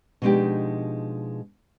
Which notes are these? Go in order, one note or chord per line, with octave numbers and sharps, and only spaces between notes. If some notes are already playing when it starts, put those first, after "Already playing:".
B2 F3 G#3 D4 D#4 G4